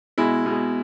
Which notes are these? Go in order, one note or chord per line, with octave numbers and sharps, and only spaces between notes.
B2 G#3 E4
B2
G#3